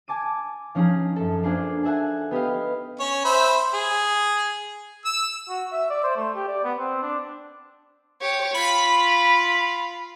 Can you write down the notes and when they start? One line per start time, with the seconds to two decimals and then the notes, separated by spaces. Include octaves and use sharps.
0.08 G#5 A5 D6 D#7
0.75 F3 C#4 D#4 F4 G#4
1.16 F#2 A4
1.43 A#3 D4 F4 G#4 A4 C5
1.83 G#4 A4 E5 F#5 G#5
2.31 B3 G4 D#5 F5
3.00 C#4 C#5
3.25 C5 E5 B5
3.74 G#4
5.05 E6
5.49 F#4
5.72 E5
5.90 D5
6.04 C5
6.16 A3
6.36 G4
6.48 D5
6.64 B3
6.78 C4
7.02 D4
8.22 G4 C#5
8.54 F4 B5